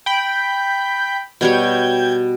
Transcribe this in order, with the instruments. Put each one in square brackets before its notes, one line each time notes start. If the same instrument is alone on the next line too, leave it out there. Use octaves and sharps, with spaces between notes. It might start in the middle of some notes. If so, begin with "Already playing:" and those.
[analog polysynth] G5 B5
[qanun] B2 G3 C#5 [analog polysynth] G5 G6 G#6